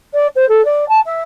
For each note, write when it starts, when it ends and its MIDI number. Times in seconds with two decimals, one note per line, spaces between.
0.14 0.27 74
0.35 0.48 72
0.48 0.64 69
0.64 0.87 74
0.88 0.99 81
1.05 1.22 76